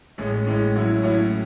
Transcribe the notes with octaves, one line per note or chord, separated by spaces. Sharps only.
A1 A2 G#3 C#4
A1 A2 G#3 C#4
A2 F#3 C#4 E4
A2 F#3 C#4 E4